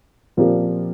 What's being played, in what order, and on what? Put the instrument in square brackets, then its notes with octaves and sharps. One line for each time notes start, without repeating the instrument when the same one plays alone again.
[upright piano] A#2 F3 C4 G4 A#4